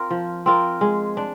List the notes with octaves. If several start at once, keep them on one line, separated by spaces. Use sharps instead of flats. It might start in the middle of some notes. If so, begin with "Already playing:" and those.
Already playing: C4 F4 A#4
F3
C4 F4 A#4
G#3
D4